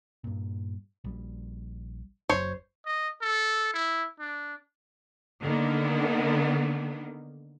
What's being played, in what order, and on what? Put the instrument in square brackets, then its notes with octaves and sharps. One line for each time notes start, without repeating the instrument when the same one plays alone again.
[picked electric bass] G2 A#2
A#1 G3
[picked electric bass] F#1 F#2 [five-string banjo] C5 C#5
[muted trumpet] D#5
A4
E4
D4
[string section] D3 D#3 A#3 B3